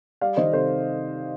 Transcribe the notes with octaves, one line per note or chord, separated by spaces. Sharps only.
G3 D5 F5
D#3 C5 D#5
C3 A4 C5